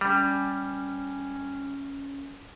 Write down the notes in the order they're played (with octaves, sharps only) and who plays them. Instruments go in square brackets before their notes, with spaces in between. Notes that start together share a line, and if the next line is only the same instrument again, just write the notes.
[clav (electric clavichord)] G3 [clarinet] C#4